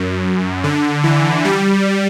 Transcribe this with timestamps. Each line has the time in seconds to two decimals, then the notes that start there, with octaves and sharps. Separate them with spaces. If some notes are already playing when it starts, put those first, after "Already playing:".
Already playing: F#2
0.64 D3
1.04 E3
1.45 G3